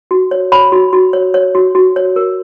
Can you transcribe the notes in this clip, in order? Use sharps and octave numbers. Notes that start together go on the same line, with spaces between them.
F#4
C#5
C#5 B5
F#4
F#4
C#5
C#5
F#4
F#4
C#5
A#4